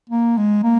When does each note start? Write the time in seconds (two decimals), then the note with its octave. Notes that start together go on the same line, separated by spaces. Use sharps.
0.10 A#3
0.37 G#3
0.63 A#3